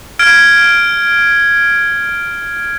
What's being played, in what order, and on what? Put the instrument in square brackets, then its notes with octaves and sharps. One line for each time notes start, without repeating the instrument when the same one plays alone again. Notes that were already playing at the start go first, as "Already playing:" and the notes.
[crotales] F6 G#6 D7